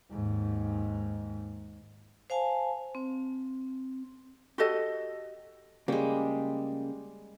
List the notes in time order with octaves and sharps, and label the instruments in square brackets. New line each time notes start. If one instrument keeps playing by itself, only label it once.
[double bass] D#2 G#2
[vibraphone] C5 F5 G#5 A5
C4
[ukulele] F#4 G4 A4 D#5
[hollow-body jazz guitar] C#3 A#3 [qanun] G3 G#3